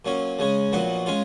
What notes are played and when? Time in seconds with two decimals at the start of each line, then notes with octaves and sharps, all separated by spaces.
0.05 A#2 F#3 C#4
0.39 C#3 G#3 C#4
0.72 A#1 A#2 F#3 B3 F#4
1.06 G#3 C#4 F4